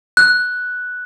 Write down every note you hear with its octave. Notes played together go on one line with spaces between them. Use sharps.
F#6